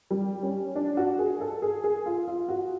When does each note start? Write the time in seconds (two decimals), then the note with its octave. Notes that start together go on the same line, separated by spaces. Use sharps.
0.11 G3
0.43 C#4
0.76 D4
0.97 F#4
1.19 G#4
1.40 A4
1.62 G#4
1.84 G#4
2.06 F4
2.28 F4
2.49 F#4